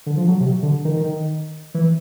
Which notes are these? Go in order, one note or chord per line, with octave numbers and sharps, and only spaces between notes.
D3
F3
F#3
C3
D3
D#3
D#3
E3